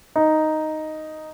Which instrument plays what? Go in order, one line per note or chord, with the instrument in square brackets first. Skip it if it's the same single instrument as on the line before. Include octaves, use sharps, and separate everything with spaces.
[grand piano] D#4